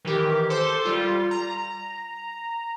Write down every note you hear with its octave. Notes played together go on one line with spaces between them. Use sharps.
D#3 E3 G4 A#4
A4 C5 C6 D6
G3 F4
A#5